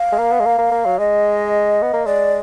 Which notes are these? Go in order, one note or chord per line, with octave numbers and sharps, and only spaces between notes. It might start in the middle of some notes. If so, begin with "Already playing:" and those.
Already playing: F5
G#3
A#3
B3
G#3
A#3
A#3
A#3
F#3
G#3 D#5
B3
A#3
G#3 D5